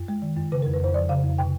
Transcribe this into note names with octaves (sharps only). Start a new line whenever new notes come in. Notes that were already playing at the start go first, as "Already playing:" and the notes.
Already playing: F#2
G#3
D#3
F#2
C#3 B4
A#4
F2
B4
F2 C5
F3 D5
C#3 F5
F2
C3 G5